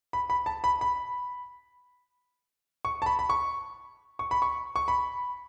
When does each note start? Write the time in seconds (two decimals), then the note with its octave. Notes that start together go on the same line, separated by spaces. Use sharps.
0.13 B5
0.30 B5
0.46 A5
0.64 B5
0.81 B5
2.85 C#6
3.02 A5
3.06 B5
3.19 B5
3.30 C#6
4.19 C#6
4.31 B5
4.42 C#6
4.76 C#6
4.88 B5